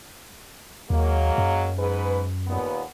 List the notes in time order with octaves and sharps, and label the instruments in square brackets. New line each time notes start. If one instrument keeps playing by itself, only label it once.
[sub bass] D#2 [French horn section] F#3 G#3 A#3
[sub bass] F#2
[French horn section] G#2 G#4 B4
D#2 A#2 B3